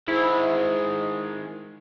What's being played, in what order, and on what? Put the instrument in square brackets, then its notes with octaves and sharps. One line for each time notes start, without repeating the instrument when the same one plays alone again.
[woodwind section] G#2 [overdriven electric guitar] D#3 G#3 [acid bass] E4